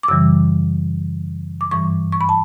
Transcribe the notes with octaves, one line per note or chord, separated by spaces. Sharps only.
D6
F#2 C#3 E3 G3 E6
D6
G2 E3 G3 C#6
C#6
B5
A5